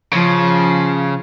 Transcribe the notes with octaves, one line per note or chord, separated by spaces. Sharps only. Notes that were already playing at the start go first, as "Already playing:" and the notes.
C#3 F3